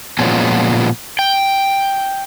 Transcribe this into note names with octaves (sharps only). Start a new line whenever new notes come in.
A#2 F3 F#3 G#3 B3 C#4
G5